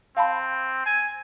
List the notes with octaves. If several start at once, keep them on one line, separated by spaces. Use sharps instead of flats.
C4 F5 A5 B5
G#5